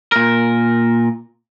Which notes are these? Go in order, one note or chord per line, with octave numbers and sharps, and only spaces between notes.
A#2 A#4